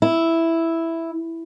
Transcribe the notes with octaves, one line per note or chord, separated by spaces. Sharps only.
E4